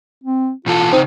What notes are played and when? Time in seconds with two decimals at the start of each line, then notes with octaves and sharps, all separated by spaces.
0.24 C4
0.66 B2 E3 F4 A4
0.93 C#3 C4 D#4